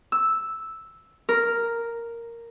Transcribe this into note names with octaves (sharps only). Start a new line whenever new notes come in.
E6
A#4